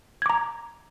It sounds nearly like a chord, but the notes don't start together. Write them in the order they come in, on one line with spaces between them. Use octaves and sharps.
G#6 D6 A#5